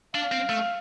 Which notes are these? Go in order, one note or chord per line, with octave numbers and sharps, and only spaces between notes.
D4 F5
C4
A3